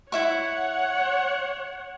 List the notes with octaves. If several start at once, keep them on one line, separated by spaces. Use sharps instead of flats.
E4 C#5 E5 F#5 C#6